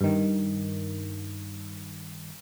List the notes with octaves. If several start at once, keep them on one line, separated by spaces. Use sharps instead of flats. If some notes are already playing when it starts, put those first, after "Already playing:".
G2 D#3